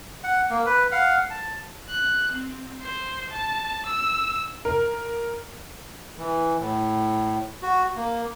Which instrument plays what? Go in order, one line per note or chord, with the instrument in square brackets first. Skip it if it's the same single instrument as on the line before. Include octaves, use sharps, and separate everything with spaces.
[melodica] F#5
A#3
B4
F5 F#5
A5
[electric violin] F#6
C4
C5
A5
E6
[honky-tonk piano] A#4
[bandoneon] E3
A2
F#4
A#3